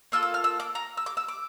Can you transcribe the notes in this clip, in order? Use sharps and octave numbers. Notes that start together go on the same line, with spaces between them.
A#3 F4 A4 E6
E6
F6
E6
D6
A#5
E6
D6
E6
D6